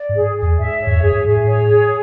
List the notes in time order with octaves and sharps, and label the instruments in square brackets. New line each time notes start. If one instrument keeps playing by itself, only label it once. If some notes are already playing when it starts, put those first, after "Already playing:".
Already playing: [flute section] D5
[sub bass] G#2
[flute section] G#4
G#4
[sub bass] E2
[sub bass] G#2 [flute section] E5
[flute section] C#5
[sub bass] E2
[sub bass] F#2 [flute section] G#4
[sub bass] G#2
[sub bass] A2 [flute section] G#4
[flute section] C#5
G#4